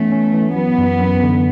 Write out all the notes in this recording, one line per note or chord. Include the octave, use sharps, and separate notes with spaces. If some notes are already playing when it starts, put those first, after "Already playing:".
Already playing: E3 A3 B3 C#4
C#4
E3
F#3 B3
F#2
F#2
D3